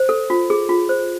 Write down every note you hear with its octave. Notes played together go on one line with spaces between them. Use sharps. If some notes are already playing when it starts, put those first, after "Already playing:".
Already playing: C5
A4
F4
G#4
F4
C5